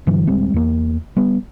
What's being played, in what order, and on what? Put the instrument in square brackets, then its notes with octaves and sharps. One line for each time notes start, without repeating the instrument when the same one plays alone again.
[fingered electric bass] G2 D3 E3 F#3
D1 G3 G#3 C4
E2 A#3
G3 B3